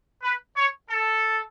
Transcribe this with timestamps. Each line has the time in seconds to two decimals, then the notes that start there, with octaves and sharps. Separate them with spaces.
0.23 B4
0.56 C#5
0.89 A4